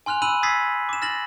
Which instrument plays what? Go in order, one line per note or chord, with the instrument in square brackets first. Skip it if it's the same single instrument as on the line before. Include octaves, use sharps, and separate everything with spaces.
[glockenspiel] G#5 C6 F6 F#6 F7
B5 E6 F#6 D#7 F7 F#7
D#6 E6 G#6 A6 B6 C7
D6 E7
F6 A6 A#6 E7 F#7